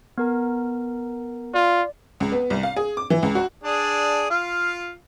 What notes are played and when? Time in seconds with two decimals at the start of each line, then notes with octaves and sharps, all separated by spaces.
0.18 B3 A#4 A#5
1.54 F4 D5
2.20 C#2
2.32 B3
2.50 C2
2.63 F5
2.76 G#4
2.97 D6
3.10 E3
3.23 C#2
3.35 F#4
3.64 D4 G#4 D5
4.30 F4 F5